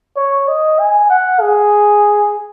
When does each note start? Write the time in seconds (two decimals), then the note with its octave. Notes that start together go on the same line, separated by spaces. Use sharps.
0.17 C#5
0.48 D#5
0.79 G#5
1.10 F#5
1.41 G#4